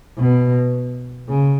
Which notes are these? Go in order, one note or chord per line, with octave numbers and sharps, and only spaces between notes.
B2
C#3